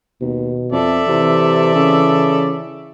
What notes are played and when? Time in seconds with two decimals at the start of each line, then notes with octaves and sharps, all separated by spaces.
0.21 D#2 B2
0.72 F2 A4 D5 E5
1.07 C3 E3
1.75 C#3